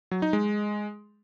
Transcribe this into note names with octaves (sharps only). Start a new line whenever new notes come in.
F#3
D#4
G#3